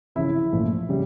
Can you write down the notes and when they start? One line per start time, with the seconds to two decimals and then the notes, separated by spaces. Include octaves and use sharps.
0.15 C#3 F3 C#4 E4 E5
0.53 A#2 F3 A3
0.89 C#3 G3